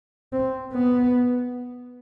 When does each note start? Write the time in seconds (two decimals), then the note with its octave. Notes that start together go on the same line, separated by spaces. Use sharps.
0.33 C4
0.73 B3